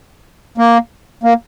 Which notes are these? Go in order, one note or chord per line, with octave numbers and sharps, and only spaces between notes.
A#3
A#3